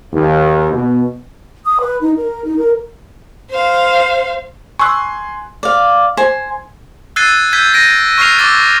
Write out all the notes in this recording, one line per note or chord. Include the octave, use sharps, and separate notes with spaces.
D#2
B2
D#6
B4
D#4
A#4
D#4
A#4
C5 F5
G#5 C6 C#6 E6 F#6
D5 F5
C5 G#5
E6 F#6 G#6 A6 C7 D#7
E6 G6 G#6 B6 D#7
A#6 D7 D#7
C#6 F6 A#6 C7 F7
C#6 D6 E6 A6